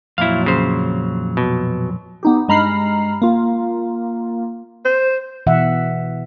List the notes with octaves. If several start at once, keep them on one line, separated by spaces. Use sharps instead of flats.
F2 A#2 F#3 E4 F5
C#3 C5
B2
B3 D#4 G4
G2 G#3 A#5 B5 F6 C7
A#3 F4
C5
B2 E3 E5 F#5